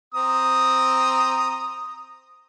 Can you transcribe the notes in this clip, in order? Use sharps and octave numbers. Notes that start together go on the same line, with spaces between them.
C4 A#5 D#6